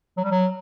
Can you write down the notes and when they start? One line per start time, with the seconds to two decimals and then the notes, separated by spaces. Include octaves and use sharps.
0.17 F#3
0.24 G3
0.31 F#3